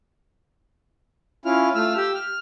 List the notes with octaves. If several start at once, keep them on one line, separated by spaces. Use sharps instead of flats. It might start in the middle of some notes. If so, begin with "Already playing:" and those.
C#4 E4 F4 F6
A3 F4 E6 F6
G4 E6
F6